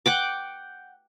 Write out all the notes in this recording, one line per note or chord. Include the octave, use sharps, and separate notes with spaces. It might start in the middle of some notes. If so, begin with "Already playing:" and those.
F#5 G5 D6